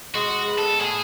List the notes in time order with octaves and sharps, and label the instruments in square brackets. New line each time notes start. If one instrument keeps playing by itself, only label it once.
[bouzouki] G#3 [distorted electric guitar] F#4
[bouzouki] B3
[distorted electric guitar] A4
[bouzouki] A2 [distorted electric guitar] G#4